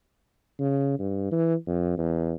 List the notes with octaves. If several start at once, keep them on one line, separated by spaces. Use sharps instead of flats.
C#3
G2
E3
F2
E2